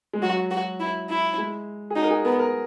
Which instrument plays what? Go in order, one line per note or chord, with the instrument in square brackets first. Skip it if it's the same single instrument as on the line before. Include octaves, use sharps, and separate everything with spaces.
[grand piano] G#3
[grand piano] F#3 [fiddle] F#4
[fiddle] F#4
E4
E4
[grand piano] G#3
G#4
[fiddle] D#4 [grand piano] F#4
[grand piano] A#4
G#4
[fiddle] B3 [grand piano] A#4
[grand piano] A#4